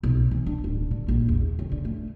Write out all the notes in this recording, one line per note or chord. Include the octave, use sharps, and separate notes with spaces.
B1
E3
D4
D1
D3
A#1
E2
C#3
D3
A3